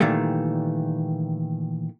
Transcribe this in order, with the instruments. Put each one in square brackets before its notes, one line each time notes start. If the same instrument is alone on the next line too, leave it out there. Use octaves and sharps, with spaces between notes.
[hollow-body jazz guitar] A#2 D#3 E3 G3 A3